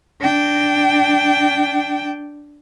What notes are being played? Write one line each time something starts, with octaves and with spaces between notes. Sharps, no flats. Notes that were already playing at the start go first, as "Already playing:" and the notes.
D4 G5